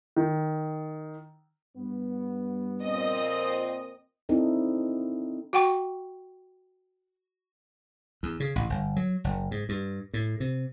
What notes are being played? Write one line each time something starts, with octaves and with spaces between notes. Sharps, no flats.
D#3
G2 B3
F2 A#2 C4 D#5
C4 D#4 E4 A4 D5
F#4 F#5 G5 C#6
E2
C#3
A1
G1
F#3
F#1
G#2
G2
A2
C3